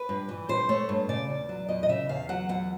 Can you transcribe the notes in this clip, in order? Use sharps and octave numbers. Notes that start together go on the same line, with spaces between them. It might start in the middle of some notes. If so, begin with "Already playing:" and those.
Already playing: B4
G2
E3
G2 C5
A3 C#5
G2
C#3 D5
E2
F#3
E2 D#5
D#5
C#3 E5
E2 F5
F#3 F#5
E2 F#5